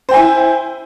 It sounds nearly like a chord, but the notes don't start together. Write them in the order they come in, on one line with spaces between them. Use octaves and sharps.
C5 G5 G#5 E4